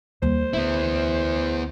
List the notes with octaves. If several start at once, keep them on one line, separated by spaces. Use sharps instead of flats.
D#2 G3 C5
D2 B3 E4